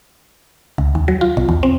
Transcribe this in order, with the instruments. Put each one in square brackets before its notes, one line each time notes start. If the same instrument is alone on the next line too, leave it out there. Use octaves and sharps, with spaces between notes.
[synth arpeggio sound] C#2
D#2
F#3
F4
B1
E2
C4